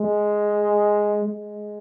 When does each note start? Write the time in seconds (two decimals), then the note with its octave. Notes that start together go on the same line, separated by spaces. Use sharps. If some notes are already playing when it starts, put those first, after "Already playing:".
Already playing: G#3
1.23 G#3